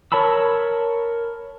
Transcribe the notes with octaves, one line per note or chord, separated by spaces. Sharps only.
A#4 C#5 A5 B5 E6